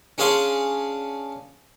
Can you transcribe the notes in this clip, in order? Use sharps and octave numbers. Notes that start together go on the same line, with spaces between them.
C#4 D4 G#4 F5 C6